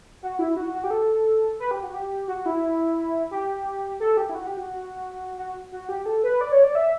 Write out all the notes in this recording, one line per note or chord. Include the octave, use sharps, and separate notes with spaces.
F#4
E4
F#4
F#4
G4
A4
B4
G4
F#4
G4
F#4
E4
G4
A4
G4
E4
F#4
G4
F#4
F#4
F#4
G4
A4
B4
D5
C#5
D5
E5